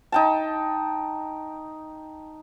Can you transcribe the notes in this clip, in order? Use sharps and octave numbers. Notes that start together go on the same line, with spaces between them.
D#4 G5 A5